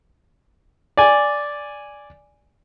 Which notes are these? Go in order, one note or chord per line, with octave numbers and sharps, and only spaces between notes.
D5 G#5